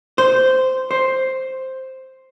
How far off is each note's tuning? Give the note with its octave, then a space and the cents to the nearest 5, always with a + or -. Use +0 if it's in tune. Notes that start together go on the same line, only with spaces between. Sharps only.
C5 -10
C5 +5